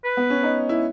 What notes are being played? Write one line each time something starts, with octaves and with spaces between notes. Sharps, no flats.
B4
B3
C#4
D#4
E4